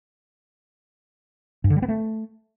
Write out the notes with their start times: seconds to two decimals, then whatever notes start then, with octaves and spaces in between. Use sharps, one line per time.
1.64 G2
1.70 D3
1.76 G3
1.82 B3
1.88 A3